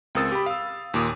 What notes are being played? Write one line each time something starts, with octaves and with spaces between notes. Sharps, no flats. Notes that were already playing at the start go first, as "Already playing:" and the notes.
C#2 C4 A#4 D#6 E6 A6
G4 B5
F5 E6
D#2 A#2 D6 D#6